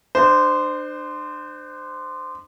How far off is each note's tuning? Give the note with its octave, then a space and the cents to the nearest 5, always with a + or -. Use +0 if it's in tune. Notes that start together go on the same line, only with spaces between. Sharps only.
D4 +35 C5 -15